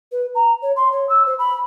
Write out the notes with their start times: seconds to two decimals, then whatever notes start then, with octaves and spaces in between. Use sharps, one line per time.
0.12 B4
0.35 A#5
0.62 C#5
0.76 C6
0.92 C#5
1.09 E6
1.26 C5
1.39 B5